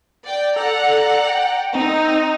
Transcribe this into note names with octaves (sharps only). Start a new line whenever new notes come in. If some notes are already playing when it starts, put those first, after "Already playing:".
D5 G5
A4 D5 F#5 A#5
G5
C4 D#4